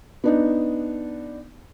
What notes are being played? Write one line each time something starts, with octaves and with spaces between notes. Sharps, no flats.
B3 D4 D#4